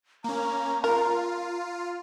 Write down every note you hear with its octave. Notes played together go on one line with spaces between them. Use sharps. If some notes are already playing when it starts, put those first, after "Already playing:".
A#3 C#4 A#5
F4 A#4